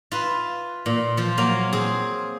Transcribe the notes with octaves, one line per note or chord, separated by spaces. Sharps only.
F4 B4 E5
A#2
F3 F4
F#3 A#3 F5
C4 G#4